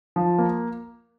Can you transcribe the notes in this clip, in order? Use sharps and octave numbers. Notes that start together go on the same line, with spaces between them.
F3
A#3